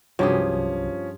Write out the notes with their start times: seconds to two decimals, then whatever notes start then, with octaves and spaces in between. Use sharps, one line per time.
0.19 C2 G2 F3 F#3 C#4 G4 G#4